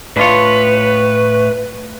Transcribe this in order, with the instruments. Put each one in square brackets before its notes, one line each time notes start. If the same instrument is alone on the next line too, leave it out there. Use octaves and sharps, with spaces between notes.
[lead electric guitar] A2 C#5 [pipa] D4 F4 [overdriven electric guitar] B4